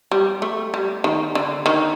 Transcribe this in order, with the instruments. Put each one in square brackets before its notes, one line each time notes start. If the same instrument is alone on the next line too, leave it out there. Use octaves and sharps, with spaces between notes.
[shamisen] G3
A3
G3
D#3
D3
D#3